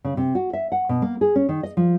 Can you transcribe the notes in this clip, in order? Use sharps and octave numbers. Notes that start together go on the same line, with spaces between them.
C#3
C3
F#4
E5
F#5
B2
A#3
G#4
C#4
D#3
D#5
F3